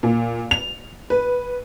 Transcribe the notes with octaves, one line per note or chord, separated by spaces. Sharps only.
A#2
F7
B4